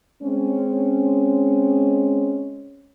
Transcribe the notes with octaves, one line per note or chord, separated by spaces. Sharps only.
G#3 C4 C#4